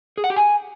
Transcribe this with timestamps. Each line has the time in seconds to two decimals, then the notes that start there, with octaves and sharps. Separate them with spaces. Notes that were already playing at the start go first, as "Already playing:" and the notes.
0.18 G#4
0.24 F#5
0.30 G4
0.36 G#5